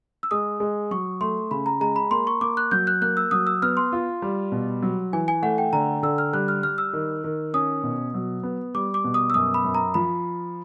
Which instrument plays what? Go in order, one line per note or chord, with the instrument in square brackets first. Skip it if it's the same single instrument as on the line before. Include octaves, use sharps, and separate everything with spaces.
[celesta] E6
[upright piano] G#3 [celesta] D#6
[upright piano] G#3
[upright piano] F#3 [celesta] C#6
[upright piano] A3 [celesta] C6
[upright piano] C#3 [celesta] B5
[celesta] A#5
[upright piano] G#3 [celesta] A#5
[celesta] B5
[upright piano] A#3 [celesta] C6
[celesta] C#6
[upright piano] A#3 [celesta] D6
[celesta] F#6
[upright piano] F#3 [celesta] G6
[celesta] F#6
[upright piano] A#3 [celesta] F#6
[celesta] E6
[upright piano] F#3 [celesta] D#6
[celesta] E6
[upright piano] B3 [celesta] F6
[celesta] C6
[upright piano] F4
G3
B2
F#3
[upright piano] E3 [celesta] G#5
[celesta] G#5
[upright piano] A3 [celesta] F#5
[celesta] G5
[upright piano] D3 [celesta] A#5
[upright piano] D3 [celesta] E6
[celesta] F6
[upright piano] G3 [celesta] F#6
[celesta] F6
[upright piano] G3 [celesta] F6
[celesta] E6
[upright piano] D#3
D#3
[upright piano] C#4 [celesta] D#6
[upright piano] B2
F#3
B3
[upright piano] G3 [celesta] D6
[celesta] D6
[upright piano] B2
[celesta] D#6
E6
[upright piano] F#2 [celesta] D#6
[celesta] B5
[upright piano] F#2
[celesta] A#5
[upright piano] F3 [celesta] B5